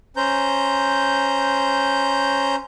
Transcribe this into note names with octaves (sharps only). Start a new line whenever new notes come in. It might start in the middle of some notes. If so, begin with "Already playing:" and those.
C#4 C5 A#5 G6